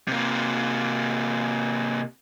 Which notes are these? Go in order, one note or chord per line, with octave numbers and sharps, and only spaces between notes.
C3 A#3